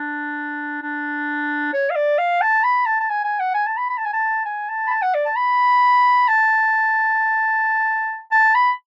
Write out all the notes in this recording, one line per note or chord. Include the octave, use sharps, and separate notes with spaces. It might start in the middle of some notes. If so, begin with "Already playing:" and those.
Already playing: D4
D4
C#5
F5
D5
F5
A5
B5
A5
A5
G#5
G#5
F#5
G#5
A5
B5
B5
A5
G#5
A5
G#5
A5
B5
A5
F#5
D5
A5
B5
A5
A5
B5